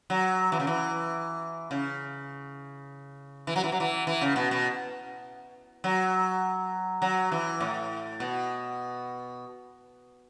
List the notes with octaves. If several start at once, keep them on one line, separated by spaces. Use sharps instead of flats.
F#3
E3
C#3
E3
C#3
E3
F#3
E3
F#3
E3
E3
C#3
B2
B2
F#3
F#3
E3
A2
B2